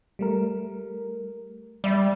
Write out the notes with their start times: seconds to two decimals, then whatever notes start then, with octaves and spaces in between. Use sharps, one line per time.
0.19 G3 A3 A#4
1.84 G3 D5 E5 B5